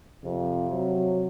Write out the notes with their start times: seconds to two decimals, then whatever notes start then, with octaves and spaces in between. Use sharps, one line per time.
0.24 F2 C3
0.73 F#3